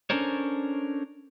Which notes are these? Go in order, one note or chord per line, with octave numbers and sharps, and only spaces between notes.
C#4 D4 A4 A#4 C5 C#5